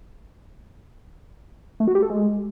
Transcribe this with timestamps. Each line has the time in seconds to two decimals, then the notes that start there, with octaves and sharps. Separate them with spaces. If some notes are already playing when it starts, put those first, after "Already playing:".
1.80 A3
1.88 F#4
1.95 G4
2.02 A4
2.10 G#3